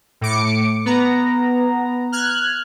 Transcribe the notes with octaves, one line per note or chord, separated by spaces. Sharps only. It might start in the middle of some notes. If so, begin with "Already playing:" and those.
A2 D6 C#7
B3 A#5
F6 F#6 G#6